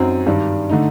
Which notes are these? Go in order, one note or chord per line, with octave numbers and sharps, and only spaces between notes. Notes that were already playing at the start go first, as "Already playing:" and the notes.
Already playing: F#2 F#3 C4 D#4
G2 D#3 G3 D4
D3 A3 D#4